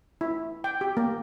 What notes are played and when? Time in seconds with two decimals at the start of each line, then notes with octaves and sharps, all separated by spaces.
0.21 E4
0.64 G5
0.81 G4
0.97 A#3